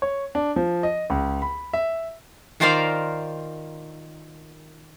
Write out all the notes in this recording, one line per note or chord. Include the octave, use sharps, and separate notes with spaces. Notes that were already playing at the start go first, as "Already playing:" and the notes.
C#5
D4
F3
D#5
C#2
B5
E5
D#3 F4 A#4 C5 D5 F5